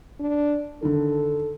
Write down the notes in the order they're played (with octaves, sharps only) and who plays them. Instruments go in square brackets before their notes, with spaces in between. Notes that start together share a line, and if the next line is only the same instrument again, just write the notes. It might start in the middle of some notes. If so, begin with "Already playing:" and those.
[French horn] D4
[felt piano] D3 D#3 [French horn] A4